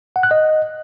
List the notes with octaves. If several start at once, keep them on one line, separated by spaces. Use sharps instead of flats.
F#5
F#6
D#5